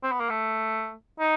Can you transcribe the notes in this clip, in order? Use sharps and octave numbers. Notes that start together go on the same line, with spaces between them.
C4
B3
A#3
A3
D#4